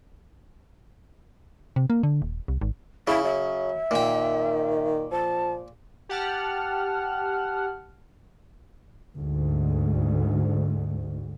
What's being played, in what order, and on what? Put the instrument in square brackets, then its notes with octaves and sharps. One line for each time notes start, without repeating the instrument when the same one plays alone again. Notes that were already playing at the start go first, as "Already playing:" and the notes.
[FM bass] C3
A#3
D3
D#1
C2
G#1
[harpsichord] C#3 [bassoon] E4 [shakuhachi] E5
[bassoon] F#3 [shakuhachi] E5
[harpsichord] A#2 G5 [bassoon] D#3
[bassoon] F3 [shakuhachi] A5
[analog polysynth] G4 F#5 A5 F6
[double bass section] D2 G#2